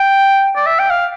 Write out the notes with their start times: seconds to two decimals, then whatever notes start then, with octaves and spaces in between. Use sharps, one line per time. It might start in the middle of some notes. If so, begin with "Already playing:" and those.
Already playing: G5
0.56 D5
0.67 E5
0.79 G5
0.91 F5